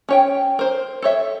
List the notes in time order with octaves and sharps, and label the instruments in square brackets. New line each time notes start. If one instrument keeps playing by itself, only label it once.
[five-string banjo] C#4 C#5 G5
A#4 C5
A4 C#5 E5